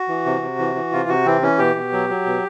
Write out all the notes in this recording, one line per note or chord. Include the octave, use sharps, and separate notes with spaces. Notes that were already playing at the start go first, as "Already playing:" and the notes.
Already playing: F#4
E3
C3
C3
E3
E3
C3 F4
C3 F#4
E3 C4
E3 C#4
B2 G4
B2
F#3
F#3
B2